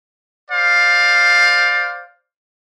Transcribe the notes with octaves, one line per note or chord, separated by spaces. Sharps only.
C5 D5 F5